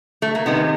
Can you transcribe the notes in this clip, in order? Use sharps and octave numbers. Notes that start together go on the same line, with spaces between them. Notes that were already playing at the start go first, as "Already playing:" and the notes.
A3
A#3
C3 D#3 G#3 B3